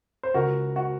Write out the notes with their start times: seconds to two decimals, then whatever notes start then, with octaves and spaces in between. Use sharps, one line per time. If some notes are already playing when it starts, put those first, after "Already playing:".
0.23 C5
0.34 C#2 F#4 A#4
0.76 F#4